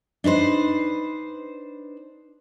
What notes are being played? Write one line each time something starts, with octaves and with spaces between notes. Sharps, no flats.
D4 D#4 B4 C5